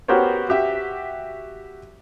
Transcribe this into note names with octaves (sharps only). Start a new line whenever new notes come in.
B3 F#4 G4 A#4 C5 C#5
F#4 G4 E5